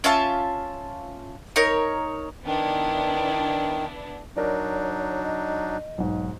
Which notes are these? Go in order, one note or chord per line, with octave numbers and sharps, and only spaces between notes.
C#4 F4 E5 A5
D#4 A#4 C#5
D#3 B3 D4 E4
F#3 D4 D#4 A#4 C#5 D5
D#5
B1 G#2